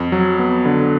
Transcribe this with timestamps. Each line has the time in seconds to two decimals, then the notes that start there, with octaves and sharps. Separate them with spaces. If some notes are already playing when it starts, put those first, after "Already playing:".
Already playing: F2
0.12 F#3
0.39 B3
0.65 D3